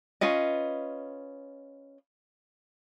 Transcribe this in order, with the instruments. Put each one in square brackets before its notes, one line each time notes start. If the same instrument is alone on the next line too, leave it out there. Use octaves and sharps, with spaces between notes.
[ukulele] C#4 F4 B4 D#5